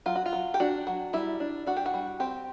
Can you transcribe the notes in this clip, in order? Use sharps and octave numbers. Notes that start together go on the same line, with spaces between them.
F#3 F4
F#4
F4
F#3
G4
D4 F#4
F#3
G3 E4
D4
D4 F#4
G4
F#4
G3
C4 G4